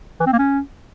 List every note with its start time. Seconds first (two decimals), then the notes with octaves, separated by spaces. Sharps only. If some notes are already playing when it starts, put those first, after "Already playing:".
0.20 E3
0.26 C4
0.32 A#3
0.39 C#4